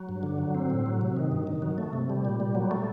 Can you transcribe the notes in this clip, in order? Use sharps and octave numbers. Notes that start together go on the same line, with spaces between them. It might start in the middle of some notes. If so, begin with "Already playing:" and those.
Already playing: F#3
G2
D3
F#3
C4
A2
F#3
C3
D#3
G2
D#3
F#3
A3
C3
G3
A#2
G3
F#3
A3